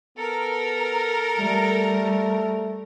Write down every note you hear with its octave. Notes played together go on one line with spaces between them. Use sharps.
B3 A4 A#4
G3 A3